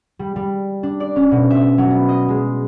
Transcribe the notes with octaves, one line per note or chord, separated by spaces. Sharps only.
G3
G3
D4
D5
C#4
B2
E5
F#3
B3
D#5
G#3